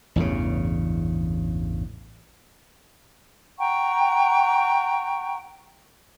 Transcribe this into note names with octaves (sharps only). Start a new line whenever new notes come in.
A1 E2 G2 C#3
F#5 G5 A#5 C#6